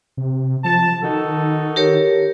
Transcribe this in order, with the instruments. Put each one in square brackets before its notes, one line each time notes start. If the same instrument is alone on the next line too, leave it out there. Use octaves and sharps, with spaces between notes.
[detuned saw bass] C3
[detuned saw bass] F3 [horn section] A5
[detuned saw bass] D#3 [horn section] D#4 F#4 A4
[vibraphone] G4 A#4 C#5